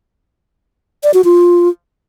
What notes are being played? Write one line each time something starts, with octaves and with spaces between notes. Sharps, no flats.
D5
F#4
F4